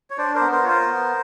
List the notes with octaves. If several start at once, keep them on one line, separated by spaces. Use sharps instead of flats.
C#5
D4 C5 D5
A#4 C5
B3
A#4 C5
F4 C#5
A#4 C5
B3